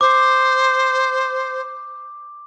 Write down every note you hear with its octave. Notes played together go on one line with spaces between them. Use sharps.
C5 D6